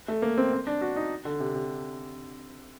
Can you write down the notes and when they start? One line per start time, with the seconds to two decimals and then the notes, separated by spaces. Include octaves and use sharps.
0.08 A3
0.22 A#3
0.38 C4
0.52 C4
0.67 D4
0.81 F#4
0.96 D#4
1.25 D3
1.40 C3
1.55 C3